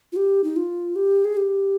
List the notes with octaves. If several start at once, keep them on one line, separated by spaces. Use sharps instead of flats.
F4
G4
D#4
F4
G4
G#4
G4